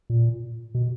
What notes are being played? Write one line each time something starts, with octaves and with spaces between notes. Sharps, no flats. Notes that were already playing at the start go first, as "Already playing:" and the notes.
A#2
B2